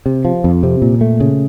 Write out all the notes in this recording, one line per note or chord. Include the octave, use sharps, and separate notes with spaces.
C3
F3
F2
C3
A#2
A3
C#3